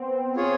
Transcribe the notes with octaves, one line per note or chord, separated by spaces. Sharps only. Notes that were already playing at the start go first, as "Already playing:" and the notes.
Already playing: B3 C4
F4 G#4 C#5